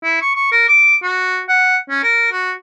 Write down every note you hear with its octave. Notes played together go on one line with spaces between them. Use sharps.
E4
C#6
C#6
A#4
D6
F#4
F#5
C#4
A#4
F#4